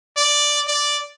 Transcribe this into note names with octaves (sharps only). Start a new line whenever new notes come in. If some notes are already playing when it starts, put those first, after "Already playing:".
D5
D5